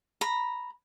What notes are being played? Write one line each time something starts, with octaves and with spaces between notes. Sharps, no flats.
A#5 B5